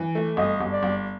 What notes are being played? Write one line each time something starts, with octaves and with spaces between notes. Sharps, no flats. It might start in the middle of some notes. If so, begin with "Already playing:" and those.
Already playing: E3
A3
G1 D#5
G1
D5
G1